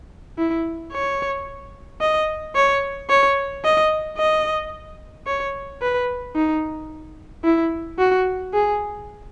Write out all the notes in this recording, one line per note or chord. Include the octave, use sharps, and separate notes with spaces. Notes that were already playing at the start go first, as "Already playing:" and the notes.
E4
C#5
D#5
C#5
C#5
D#5
D#5
C#5
B4
D#4
E4
F#4
G#4